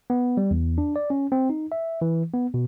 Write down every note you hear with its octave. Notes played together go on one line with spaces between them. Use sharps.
B3
G3
E2
D4
D5
C#4
C4
D#4
E5
E3
B3
B2